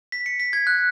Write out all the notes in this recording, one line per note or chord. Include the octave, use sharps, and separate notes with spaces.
B6
C#7
B6
G#6
F#6